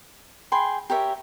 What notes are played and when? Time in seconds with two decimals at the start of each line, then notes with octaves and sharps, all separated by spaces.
0.52 G#4 G5 B5 C6
0.90 G4 A#4 C#5 E5